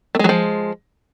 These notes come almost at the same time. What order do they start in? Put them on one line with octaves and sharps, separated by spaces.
A3 G#3 F#3 F3